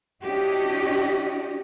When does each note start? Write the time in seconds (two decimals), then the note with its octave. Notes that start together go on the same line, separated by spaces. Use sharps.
0.24 C#4 D4 E4 F#4 G4 D#5